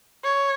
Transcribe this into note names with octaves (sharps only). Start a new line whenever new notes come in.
C#5